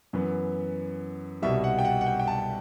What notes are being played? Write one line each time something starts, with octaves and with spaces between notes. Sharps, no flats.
F#2 E3 B3
C2 B2 G3 E5
F#5
G5
F#5
F#5
G5
G5
A5